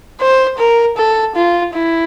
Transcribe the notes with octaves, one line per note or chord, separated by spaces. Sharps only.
C5
A#4
A4
F4
E4